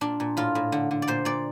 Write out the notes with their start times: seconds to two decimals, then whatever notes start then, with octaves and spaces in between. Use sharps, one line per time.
0.01 A#2 D4
0.20 A#2
0.37 A2 F4
0.55 A2
0.72 D3
0.91 D3
1.02 D5
1.08 A#2 C5
1.25 A#2 D5